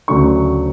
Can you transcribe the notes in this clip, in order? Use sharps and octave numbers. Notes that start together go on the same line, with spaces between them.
D2 C#3 F#3 A3 D4 C#6